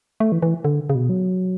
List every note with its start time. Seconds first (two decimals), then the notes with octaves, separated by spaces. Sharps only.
0.20 A3
0.32 E3
0.42 E3
0.65 D3
0.90 C#3
0.95 B2
1.09 F#3